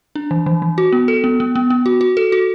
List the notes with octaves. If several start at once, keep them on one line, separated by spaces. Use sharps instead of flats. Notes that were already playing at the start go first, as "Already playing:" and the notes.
D4
E3
E3
E3
F#4
B3
A4
B3
B3
B3
B3
F#4
F#4
A4
F#4